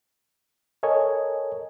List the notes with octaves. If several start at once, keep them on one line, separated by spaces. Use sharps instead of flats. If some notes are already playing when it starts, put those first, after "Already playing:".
A4 A#4 C#5 D#5 G#5